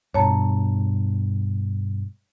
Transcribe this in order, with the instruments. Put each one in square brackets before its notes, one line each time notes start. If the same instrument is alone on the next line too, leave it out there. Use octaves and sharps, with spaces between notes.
[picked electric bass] G2 B2 [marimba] C#5 A5 A#5